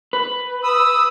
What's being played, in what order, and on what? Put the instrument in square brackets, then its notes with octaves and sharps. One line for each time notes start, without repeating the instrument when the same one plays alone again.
[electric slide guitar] B4
[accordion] D#6 E6